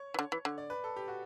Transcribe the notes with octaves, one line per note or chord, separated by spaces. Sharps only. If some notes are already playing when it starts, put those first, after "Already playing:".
Already playing: C#5
E3
D3
E3
D3
D5
B4
A4
G4
F#4